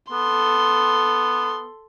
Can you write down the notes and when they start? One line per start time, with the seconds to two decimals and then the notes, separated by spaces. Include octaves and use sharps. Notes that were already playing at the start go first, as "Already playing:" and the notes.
0.12 B3 A4 C6